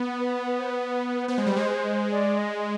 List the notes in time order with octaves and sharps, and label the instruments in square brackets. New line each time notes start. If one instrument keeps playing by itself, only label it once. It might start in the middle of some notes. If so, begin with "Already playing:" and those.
Already playing: [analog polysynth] B3
[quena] B4
B4
C5
B4
[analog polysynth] B3 [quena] C5
[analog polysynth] G#3
G3
G#3
[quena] D5
D#5
D#5